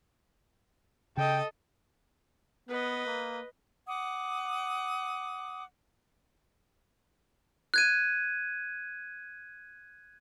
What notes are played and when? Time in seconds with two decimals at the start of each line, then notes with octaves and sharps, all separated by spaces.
1.17 C#3 A4 D#5 G5
2.69 B3 B4 D#5
3.06 A#3
3.88 F#5 D6 D#6
7.74 F#6 G#6 D#7